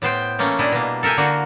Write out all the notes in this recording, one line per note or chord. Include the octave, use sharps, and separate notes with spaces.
A2 B3 C5 G5
E3 A3 A#3 C#4
A#2 G3 D4 E4 D#5
B2 A#3
A4 A#4 E5 G5 G#5
D3 A#3 F#4